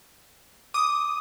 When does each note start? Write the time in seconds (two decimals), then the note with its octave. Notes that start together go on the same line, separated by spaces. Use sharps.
0.74 D6 D#6